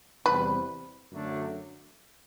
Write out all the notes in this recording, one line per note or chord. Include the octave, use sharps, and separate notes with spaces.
E2 C3 G3 C4 E4 B4
F#2 D3 F#3 A3 D4